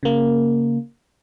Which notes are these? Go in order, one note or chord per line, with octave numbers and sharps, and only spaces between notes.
C#3 A#3